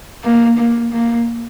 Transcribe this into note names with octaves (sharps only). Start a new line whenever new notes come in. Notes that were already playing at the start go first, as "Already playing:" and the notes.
A#3
A#3
A#3